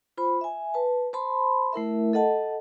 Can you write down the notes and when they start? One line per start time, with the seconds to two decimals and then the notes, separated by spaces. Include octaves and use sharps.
0.17 F4 C5 B5
0.41 E5 G#5
0.74 B4 A5
1.13 C5 A5 B5 C6
1.73 A3 E4 A#4 E5
2.13 A4 D#5 F#5 A5